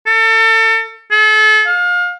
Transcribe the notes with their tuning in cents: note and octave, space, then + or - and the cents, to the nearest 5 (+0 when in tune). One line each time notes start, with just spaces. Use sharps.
A4 +35
A4 -35
F5 +30